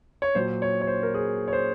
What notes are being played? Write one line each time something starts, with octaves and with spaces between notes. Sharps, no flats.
C#5
A#2 F#3 C5
C#5
C#5
C5
A#4
G#4
C#5
C5